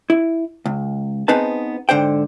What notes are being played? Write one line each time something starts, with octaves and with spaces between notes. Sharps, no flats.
E4
C#2
B3 C4 D#4 G#4 B4 A5
G#2 D3 C5 G5